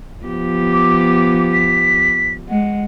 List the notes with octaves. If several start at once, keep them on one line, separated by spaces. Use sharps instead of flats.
F3 B3 G4
D6
B6
G#3 F#5